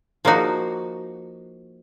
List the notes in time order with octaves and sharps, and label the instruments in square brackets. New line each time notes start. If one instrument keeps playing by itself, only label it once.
[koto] F3 A#3 D#4 F#4